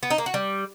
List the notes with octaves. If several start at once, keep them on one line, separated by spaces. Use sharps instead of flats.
B3
D#4
A#3
F#4
G3